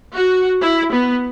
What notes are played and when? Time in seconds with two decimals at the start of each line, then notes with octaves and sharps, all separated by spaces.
0.15 F#4
0.61 E4
0.91 B3